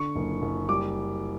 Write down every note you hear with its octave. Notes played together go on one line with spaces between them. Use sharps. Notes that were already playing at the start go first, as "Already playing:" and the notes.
Already playing: D3 C#6
F#1
F#1
G3 D6